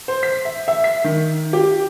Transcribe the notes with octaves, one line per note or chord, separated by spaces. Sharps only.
C5
B6
E5
E5
B6
D#3
G4